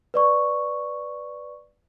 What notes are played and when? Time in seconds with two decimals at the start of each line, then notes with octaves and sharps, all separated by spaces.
0.14 B4 D5 C#6